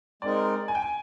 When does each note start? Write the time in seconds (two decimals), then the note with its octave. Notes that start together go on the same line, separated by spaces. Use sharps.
0.22 G#3 C4 D#4 A#4 D5
0.68 G#5
0.75 G5
0.82 G#5